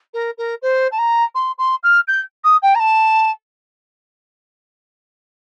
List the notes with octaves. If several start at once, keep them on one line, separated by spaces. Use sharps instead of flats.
A#4
A#4
C5
A5
A#5
C6
C6
F6
G6
D#6
G5
A#5
A5